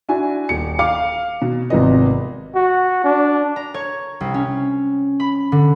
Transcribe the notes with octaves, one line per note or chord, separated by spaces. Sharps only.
D4 E4 F#4 G#5
D#1 C#7
F5 D6 C#7
B2
G#1 C3 F3 B3 D#5
F#4
D4
A#5
C#5
C2
C#4
B5
D3